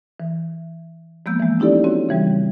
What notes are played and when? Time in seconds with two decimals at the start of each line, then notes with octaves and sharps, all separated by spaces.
0.20 E3
1.26 F3 G#3 A#3 B3 E6 G6
1.40 E3 G#3
1.59 C#4 D#4 E4 G4 A4 D5
1.84 C4 F#4 C#5
2.09 C#3 E3 G3